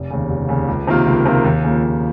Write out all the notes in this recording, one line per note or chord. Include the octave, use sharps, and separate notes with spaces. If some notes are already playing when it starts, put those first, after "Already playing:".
Already playing: F1
D#2 C#3
F1
D#2 C#3
C#2
C3 D#3 A#3 F4
C#2
C3 D#3 A#3 F4
D#2
C#3 F3 A#3
D#2